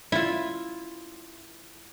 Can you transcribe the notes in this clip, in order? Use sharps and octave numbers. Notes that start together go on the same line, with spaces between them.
E4 F4